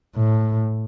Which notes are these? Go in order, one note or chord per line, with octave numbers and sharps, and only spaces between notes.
A2